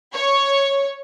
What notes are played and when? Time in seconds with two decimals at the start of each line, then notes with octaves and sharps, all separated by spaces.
0.13 C#5